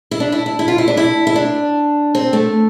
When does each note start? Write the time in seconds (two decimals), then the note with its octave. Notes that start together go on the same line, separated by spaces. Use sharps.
0.11 E4
0.20 D4
0.32 E4
0.46 E4
0.59 E4
0.68 F4
0.78 E4
0.88 D4
0.97 E4
1.27 E4
1.36 D4
2.15 C4
2.33 A3